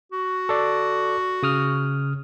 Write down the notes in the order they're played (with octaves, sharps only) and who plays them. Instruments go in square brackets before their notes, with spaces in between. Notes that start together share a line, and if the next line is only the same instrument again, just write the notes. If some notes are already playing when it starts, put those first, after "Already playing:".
[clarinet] F#4
[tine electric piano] A4 D5
C#3 D#6 F6